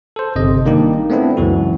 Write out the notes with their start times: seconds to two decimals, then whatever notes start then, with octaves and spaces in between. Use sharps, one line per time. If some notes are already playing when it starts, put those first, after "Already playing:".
0.16 A4 C5
0.36 G1 C3 D#5
0.65 D#3 G3 A#3 D4 D#4 G4
1.10 A3 B3 C4 D4 E4
1.37 C#2 F#2 E3 F#4